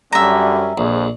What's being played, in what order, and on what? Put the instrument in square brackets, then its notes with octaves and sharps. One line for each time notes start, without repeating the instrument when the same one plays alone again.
[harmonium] F#2 G3 C#4 [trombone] D3 [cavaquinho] E5 A#5
[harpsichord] A#1 [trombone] F2 [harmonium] G#4